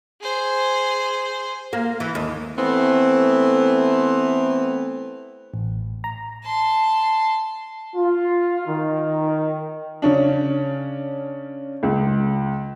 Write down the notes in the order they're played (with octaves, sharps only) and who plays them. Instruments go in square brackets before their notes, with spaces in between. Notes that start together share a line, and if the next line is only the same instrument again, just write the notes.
[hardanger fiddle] G#4 C5
[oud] A#3
E3
D#2
[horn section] E3 A3 B3 C4
[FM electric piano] A1
A#5
[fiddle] A5 C6
[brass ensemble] F4
D#3
[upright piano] C#3 C#4 D4
C#2